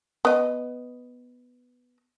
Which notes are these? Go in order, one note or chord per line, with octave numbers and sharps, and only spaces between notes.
B3 D#5